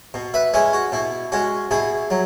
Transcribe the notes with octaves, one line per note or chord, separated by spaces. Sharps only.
B2
B4 E5
G#3 C#4 E4 G#4
F#4
B2 E4
G#3 C#4 F#4
B2 E4 G#4
F#3